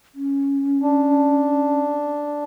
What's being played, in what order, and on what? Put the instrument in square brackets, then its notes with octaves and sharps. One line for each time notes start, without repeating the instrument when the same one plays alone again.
[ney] C#4
[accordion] D4